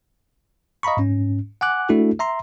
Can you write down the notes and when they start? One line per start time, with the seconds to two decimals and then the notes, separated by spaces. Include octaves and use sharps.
0.83 D#5 F5 A#5 B5 C#6
0.97 G#2 C#4
1.61 F#5 G#5 D6 F#6
1.89 A3 D4 E4 F#4 A4
2.19 E5 A#5 C6